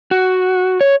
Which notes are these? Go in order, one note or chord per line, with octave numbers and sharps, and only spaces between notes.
F#4
C#5